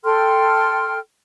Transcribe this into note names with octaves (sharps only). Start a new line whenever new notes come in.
A4 G5 C6 F6